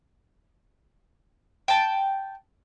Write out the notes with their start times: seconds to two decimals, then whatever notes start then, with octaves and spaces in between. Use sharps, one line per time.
1.68 G5 A5